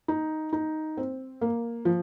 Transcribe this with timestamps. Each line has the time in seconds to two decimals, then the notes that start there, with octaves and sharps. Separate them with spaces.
0.08 D#4
0.53 D#4
0.97 C4
1.41 A#3
1.85 F3